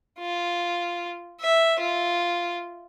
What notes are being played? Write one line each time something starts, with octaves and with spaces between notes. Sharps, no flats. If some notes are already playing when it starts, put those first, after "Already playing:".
F4
E5
F4